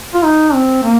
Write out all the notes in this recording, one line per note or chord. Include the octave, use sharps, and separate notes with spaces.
F4
D#4
C4
A#3